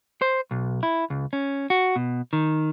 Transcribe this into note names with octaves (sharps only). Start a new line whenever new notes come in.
C5
B1
E4
C#2
C#4
F#4
B2
D#3